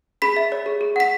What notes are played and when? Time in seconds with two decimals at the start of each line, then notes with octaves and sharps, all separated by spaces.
0.22 G#4 B5 B6
0.37 E5
0.52 C#5
0.66 G#4
0.81 G#4
0.96 F#5 B6